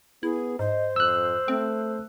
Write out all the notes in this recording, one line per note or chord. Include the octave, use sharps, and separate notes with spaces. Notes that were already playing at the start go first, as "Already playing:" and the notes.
B3 E4 G#4
G#2 C5 D#5
F2 E6 F#6
A3 C4